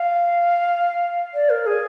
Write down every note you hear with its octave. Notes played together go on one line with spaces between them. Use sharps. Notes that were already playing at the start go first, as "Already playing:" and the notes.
Already playing: F5
D5
A#4
G#4